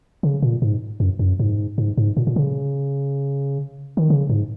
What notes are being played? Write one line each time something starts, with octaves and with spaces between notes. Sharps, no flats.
C#3
A#2
G#2
F#2
F#2
G#2
G#2
G#2
A#2
A#2
C#3
D#3
C#3
G#2